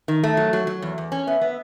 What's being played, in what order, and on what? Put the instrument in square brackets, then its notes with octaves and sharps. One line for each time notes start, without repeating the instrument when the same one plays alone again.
[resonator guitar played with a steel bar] D#3
A3
F#3
F#3
F#3
E2
E2
C#4
[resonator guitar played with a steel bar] B3 [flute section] E5
[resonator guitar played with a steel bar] B3